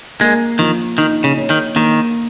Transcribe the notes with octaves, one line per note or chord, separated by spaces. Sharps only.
G#3 A#3
D#3 F3
D#3 D#4
C#3
C#5
D#3
D#3 A#3